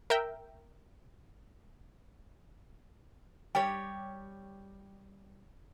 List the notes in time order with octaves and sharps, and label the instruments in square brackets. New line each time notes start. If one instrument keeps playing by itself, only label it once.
[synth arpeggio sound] A#4 E5 G5
[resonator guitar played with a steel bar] G3 G4 C#5 [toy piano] G5